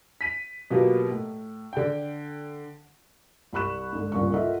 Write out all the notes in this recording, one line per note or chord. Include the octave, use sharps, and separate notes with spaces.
B6 D#7
B2 F#3 A#3 B3 F4 G4
A2
D3 G5
C2 G3 B5 C#6 F#6 E7
G#2 D3
C2 A#2 C#3 F4 C#6
F4 A4 A#4 D#5 E5 F#5